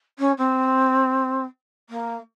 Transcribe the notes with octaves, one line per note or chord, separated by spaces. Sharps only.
C#4
C4
A#3